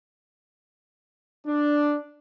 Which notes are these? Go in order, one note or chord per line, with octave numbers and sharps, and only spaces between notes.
D4